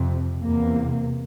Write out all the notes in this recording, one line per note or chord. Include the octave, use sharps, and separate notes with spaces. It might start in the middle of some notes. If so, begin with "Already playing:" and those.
Already playing: F2 C3
E2 C3 A#3